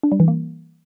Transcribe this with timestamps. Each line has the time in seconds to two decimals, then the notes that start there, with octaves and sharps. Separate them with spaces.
0.03 D4
0.12 G3
0.20 E3
0.28 A#3